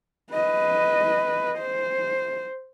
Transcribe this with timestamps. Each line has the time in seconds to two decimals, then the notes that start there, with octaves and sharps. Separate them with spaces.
0.32 B4 D#5
1.58 C5